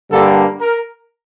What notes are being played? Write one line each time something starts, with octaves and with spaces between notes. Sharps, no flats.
G2 D3 G3 A#3 A4
A#4